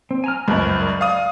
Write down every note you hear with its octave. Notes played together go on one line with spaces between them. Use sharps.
C4
G#5 A#5 F6
C#2 F#2 A#4 C5 B5
D5
F5 D#6